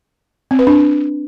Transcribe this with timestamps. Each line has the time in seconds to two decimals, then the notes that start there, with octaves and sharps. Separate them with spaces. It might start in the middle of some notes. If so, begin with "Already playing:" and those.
0.51 C4
0.59 B4
0.67 D4